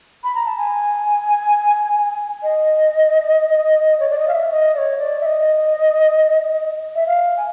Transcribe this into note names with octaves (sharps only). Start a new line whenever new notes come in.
B5
A#5
A5
G#5
D#5
C#5
D5
D#5
F5
E5
D#5
D5
C#5
D5
E5
D#5
E5
F5
G#5